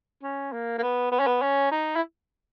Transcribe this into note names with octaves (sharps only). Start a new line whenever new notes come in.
C#4
A#3
A#3
B3
B3
C#4
B3
C#4
D#4
E4